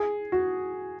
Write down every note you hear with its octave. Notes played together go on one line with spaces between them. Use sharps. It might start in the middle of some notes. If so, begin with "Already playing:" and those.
Already playing: G#4
F#4